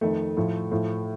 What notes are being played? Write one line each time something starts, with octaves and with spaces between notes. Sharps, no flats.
F2 D#3 A3
A2 F3
A2 F3